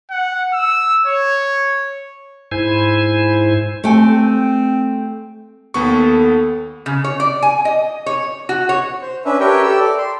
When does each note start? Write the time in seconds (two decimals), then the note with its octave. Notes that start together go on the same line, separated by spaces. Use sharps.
0.11 F#5
0.53 E6
1.06 C#5
2.51 G#2 E4 C5 G#5
3.84 A3 C4 G4 G#5
5.74 D#2 B3 A4 C#6
6.86 C#3
7.04 C#5
7.20 D5
7.42 G#5
7.65 D#5
8.06 C#5
8.49 F#4
8.69 C#5
9.02 C5
9.25 C#4 D4 B4 E5
9.40 G4 A#4 B4 C#5 E5 G5
9.63 G4 A4 E6
9.80 D5
9.98 C6